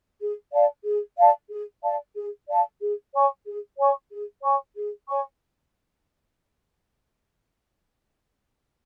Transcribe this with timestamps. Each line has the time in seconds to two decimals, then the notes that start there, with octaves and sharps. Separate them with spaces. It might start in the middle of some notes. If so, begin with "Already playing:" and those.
0.20 G#4
0.52 D5 F5 A5
0.84 G#4
1.17 D5 F5 A5
1.50 G#4
1.83 D5 F5 A5
2.15 G#4
2.48 D5 F5 A5
2.80 G#4
3.13 C#5 G#5 C#6
3.46 G#4
3.78 C#5 G#5 C#6
4.11 G#4
4.43 C#5 G#5 C#6
4.76 G#4
5.08 C#5 G#5 C#6